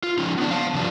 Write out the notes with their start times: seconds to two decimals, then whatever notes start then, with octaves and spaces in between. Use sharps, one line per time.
0.03 F4
0.18 F3 C#4 D#4
0.38 B3 D4
0.51 F5 A5
0.75 C#3 F3 G3 D4